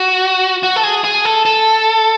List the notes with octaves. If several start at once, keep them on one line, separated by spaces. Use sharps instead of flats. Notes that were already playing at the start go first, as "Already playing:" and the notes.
Already playing: F#4
F#4
A4
G#4
G#4
A4
A4